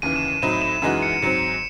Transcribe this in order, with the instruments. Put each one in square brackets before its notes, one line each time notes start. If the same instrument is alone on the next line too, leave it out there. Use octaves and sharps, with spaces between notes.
[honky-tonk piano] D#2 C#3 E3 [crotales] D#7
[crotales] E7
D#7
[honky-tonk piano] A2 F#3 C4 D#4 [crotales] E7
[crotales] E7
[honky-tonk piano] F#2 E3 G#3 D#4 F#4
[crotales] C#7
[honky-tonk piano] G#2 F#3 C4 [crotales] C#7